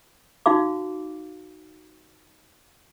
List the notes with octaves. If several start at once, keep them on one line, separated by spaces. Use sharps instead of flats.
D#4 F#4 F5 D6